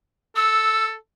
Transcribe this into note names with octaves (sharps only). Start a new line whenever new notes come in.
A4 E6